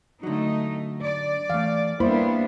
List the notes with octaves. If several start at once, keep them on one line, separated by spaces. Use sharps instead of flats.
D3 F#3 A3 D#4
D5
E3 A3 F5
G3 A#3 B3 D4 E4 C5 B5